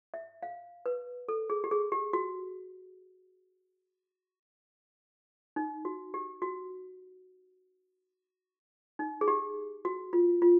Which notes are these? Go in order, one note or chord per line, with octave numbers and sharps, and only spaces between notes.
E5
F5
B4
A4
G#4
G4
G#4
G4
F#4
D#4
F#4
G4
F#4
D#4
G#4
G4
F#4
F4
F4